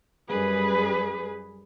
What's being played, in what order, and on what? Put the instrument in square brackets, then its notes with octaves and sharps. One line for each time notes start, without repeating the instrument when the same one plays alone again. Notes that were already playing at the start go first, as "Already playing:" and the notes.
[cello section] F#2 G3 G#4 B4